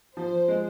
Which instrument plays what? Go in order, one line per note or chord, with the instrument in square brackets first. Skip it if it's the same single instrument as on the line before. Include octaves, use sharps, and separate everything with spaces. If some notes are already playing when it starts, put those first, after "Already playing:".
[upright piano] F3 [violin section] C5
[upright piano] G#3